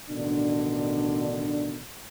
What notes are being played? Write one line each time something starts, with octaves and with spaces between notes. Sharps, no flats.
A1 B2 D3 D#3 D4